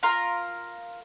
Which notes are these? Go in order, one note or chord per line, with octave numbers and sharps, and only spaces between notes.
F4 A#4 A#5